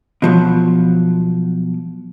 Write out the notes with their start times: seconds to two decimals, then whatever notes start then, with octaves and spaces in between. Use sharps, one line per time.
0.22 B2 F3 F#3